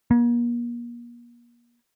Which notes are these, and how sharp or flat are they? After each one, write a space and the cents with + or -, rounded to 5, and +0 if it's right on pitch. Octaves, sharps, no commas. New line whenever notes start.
A#3 +40